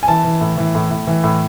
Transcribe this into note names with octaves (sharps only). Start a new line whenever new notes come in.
G#5
E3 A5
E3
A2
E3
A2
A2
E3
A2